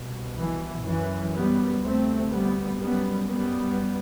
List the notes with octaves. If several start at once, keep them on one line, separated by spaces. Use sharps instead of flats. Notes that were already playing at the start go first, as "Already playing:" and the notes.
Already playing: C2 B2
E3
F#2 E3
G3 B3
D2 C3 A3 C4
G3 B3
F#2 G3 B3
G3 B3